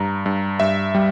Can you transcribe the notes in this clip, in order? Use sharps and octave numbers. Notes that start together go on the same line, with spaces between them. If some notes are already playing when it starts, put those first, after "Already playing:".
Already playing: G2 A#5
G2
G2 E5
G3